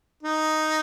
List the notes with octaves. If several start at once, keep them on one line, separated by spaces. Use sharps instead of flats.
D#4